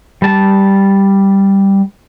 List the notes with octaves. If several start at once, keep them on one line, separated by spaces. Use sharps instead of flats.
G3 A5